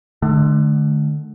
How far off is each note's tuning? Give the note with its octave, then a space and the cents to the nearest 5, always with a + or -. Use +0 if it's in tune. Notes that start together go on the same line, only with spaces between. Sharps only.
D3 +25 A3 -35